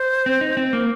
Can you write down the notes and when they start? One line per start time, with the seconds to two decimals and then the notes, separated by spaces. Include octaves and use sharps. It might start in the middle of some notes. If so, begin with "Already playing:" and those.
Already playing: C5
0.26 C4
0.41 D#4
0.57 C4
0.73 A#3